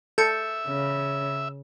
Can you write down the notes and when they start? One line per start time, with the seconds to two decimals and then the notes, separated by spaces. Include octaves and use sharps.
0.18 A4 E5 G6 A6 C#7
0.67 C#3